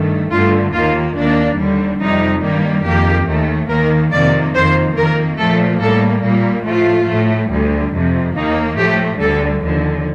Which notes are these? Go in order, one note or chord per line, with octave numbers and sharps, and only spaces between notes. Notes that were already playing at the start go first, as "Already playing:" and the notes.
Already playing: G2 D#3 A3
G2 D3 A3 F4
D#2 D#3 A#3 F4
D#2 D#3 A#3 D4
D#2 D3 G3
F2 C3 G3 D#4
G2 D#3 G3 A#3
F2 D#3 A#3 G4
D#2 D#3 A3
D#2 D#3 A#3 A#4
F2 C3 D#3 A#3 D5
F2 D#3 A#3 C5
F2 D#3 A#3 A#4
A#2 F3 A3 A4
A2 G3 A#3 A4
A#2 G3 A#3
A2 F3 A3 F4
A2 A3
D2 D3 G3
F2 C3 F3
D#2 D#3 A#3 D#4
A2 F3 A3 G4
D2 D3 G3 A4
D#2 D3 F3